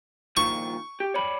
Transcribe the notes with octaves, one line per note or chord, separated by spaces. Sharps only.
A#2 D#3 F3 C#6
G4
C#5 D5 B5